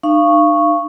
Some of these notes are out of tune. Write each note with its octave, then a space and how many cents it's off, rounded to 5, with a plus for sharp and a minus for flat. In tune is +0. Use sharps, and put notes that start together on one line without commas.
D#4 -45 F5 -25 C#6 -5